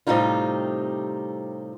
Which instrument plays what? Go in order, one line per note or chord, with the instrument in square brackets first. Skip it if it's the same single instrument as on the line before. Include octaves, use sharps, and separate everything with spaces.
[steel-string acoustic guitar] A2 C3 G3 C4 D#4 F4